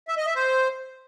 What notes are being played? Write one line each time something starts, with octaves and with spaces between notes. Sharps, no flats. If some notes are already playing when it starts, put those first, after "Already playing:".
E5
D#5
E5
C5